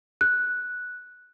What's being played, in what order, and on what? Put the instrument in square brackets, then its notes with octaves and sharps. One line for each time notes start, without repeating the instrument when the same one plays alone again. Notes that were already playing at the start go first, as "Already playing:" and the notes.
[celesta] F#6